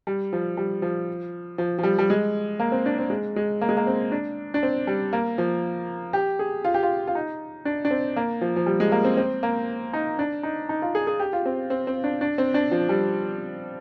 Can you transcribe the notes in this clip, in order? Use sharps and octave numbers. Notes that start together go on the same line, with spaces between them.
G3
F3
G3
F3
F3
F3
G3
G3
G#3
A#3
C4
D4
C4
G#3
G#3
A#3
G#3
A#3
C4
D4
D4
C4
G3
A#3
F3
G4
G#4
F4
G4
F4
F4
D#4
D4
D4
C4
A#3
F3
F3
G3
G#3
A#3
C4
C4
A#3
D#4
D4
D#4
D#4
F4
G#4
G#4
G4
F4
C4
C4
C4
D4
D4
C4
D4
F3
G3